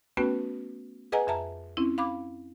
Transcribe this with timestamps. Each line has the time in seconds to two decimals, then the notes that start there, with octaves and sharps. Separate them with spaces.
0.17 A3 B3 C#4 F#4 B4 G5
1.12 G#4 B4 D#5 F#5 G#5 A#5
1.27 F2 E5 A5 A#5
1.77 C4 C#4 E4
1.98 F5 B5 D6